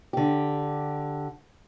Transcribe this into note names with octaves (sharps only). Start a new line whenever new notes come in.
D3 G4